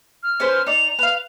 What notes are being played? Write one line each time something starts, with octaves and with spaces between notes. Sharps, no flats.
F6
C#4 B4 C5
D#4 D5 F7
B4 F5